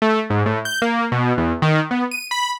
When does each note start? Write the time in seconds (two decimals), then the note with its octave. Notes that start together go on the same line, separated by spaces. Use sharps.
0.02 A3
0.30 G#2
0.46 A2
0.65 G6
0.82 A#3
1.12 B2
1.38 E2
1.62 D#3
1.91 B3
2.11 D#7
2.31 B5